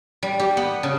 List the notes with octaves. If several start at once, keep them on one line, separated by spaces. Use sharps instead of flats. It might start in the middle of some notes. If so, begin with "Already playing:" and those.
G3
G4
B3
C#3